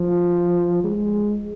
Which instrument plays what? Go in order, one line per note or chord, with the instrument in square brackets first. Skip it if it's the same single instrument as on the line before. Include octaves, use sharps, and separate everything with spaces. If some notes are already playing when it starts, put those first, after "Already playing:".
Already playing: [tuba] F3
G#3